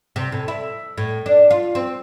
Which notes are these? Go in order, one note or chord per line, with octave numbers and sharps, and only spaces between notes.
C3
A2
E4
A2
D4
F4
C4